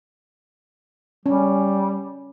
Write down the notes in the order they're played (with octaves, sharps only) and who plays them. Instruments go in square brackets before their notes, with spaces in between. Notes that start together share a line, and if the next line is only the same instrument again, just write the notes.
[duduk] G3 [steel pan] C#4